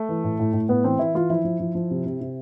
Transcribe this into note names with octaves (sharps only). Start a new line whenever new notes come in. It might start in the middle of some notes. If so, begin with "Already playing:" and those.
Already playing: A3
E3
A2
A2
A2
A2 B3
E3 C4
E3 E4
E3 F4
F3 E4
F3
F3
F3
C3
C3
C3